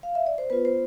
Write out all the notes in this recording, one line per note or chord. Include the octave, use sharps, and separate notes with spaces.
F5
E5
D5
C5
B3 F4 B4
C5